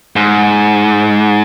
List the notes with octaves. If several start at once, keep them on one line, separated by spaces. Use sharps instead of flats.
G#2